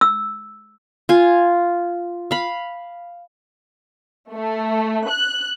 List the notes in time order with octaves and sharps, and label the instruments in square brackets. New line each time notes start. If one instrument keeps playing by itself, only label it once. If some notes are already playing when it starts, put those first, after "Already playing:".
[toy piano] E6
[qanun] F4 G#5
F5 B5
[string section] A3
F#6